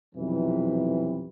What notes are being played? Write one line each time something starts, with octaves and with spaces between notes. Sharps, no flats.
B1 F2 C3 E3